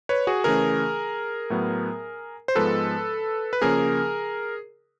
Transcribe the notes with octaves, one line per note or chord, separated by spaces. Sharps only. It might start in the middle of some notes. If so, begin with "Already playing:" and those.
B4 C#5
F#4 G#4
C#3 E3 A3 C#4 G#4 A#4
A2 F#3 B3
C5
G#2 F3 G#3 B3 A4 B4
B4
C#3 F3 A#3 C#4 G#4 A#4